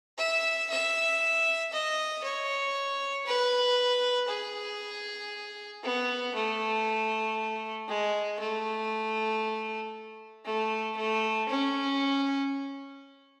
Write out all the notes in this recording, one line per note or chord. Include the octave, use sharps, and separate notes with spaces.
E5
E5
D#5
C#5
B4
G#4
B3
A3
G#3
A3
A3
A3
C#4